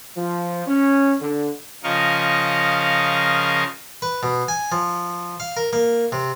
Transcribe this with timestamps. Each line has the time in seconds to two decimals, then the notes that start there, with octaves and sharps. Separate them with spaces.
0.17 F3
0.66 C#4
1.20 D3
1.84 C#3 F3 A#4 D#5 F5 C#6
4.02 B4
4.23 B2
4.48 G#5
4.72 F3
5.40 F5
5.57 A#4
5.73 A#3
6.12 C3